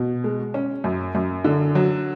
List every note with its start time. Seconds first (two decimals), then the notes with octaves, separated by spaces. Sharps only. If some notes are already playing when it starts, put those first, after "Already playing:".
Already playing: B2
0.24 G#3
0.54 C#4
0.84 F#2
1.15 F#2
1.45 D3
1.75 F#3